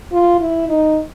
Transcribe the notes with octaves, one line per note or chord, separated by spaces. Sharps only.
F4
E4
D#4